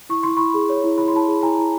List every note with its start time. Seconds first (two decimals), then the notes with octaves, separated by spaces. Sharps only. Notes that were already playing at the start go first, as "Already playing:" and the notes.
0.09 E4 C#6
0.23 E4 C6
0.37 E4 B5 C#6
0.54 G#4
0.69 C#5
0.84 E4
0.98 E4 B5
1.08 C6
1.14 E4 A5 B5
1.28 G#4
1.43 E4 G#5 A#5
1.58 E4